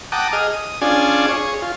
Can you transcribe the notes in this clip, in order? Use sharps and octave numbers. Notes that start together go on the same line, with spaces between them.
F#5 G5 A5 A#5 D6 D#6
G#4 D#5 F6
D#6
C#4 D4 F4 G#4 D5 G#5
G#4 C#5
F4